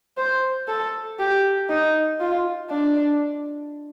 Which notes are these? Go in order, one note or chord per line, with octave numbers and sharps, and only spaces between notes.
C5
A4
G4
D#4
F4
D4